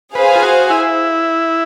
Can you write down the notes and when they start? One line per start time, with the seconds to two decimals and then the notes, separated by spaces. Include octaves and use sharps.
0.14 G#4 B4 C5 F5 G#5
0.35 F4
0.43 F#4
0.70 E4